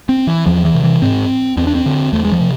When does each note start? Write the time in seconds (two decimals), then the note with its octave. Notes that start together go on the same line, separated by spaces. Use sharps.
0.09 C4
0.27 E3
0.46 E2 F3
0.65 E3
0.74 C3
0.83 E3
1.02 G#2 C4
1.57 E2 C4
1.67 D4
1.75 C4
1.86 D3
2.13 E2 A3
2.25 G#3
2.32 F3
2.40 C3